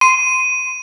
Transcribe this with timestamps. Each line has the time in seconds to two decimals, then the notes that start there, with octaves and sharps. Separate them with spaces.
0.01 C6 D#7